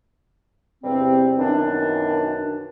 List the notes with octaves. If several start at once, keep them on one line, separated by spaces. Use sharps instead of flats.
E2 G2 C3 G3 C4
F#2 B2 D#3 E3 D4